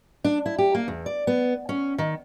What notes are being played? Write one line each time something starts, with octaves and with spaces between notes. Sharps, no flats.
D4
E4
G4
A#3
E2
D5
B3
C#4
D#3